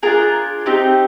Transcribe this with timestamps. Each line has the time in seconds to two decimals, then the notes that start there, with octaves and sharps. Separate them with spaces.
0.03 D4 F4 G#4 A#4
0.66 C4 D#4 G4